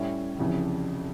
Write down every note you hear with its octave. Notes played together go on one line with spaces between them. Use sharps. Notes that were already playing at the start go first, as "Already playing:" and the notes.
Already playing: A2 G3 C#4 E4
F1 F2 C#3 E3